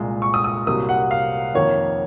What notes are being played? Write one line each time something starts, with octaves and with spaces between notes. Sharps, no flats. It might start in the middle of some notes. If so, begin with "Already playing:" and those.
Already playing: C2 A#2 G#3
C#6
D#6
D#6
C2 C3 F#3 A#3 D#6
F#5
F5
F2 D#3 A#3 C#5